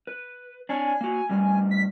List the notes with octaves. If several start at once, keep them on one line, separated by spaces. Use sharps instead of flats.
B4
D4 C#5 G#5
A#3 F#4
A2 G3
B6